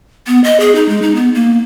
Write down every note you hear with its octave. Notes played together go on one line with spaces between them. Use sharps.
B3
D#5
G#4
D#4
G#3
D#4
B3
A#3